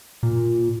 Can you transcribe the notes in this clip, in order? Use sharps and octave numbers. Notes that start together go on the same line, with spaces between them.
A#2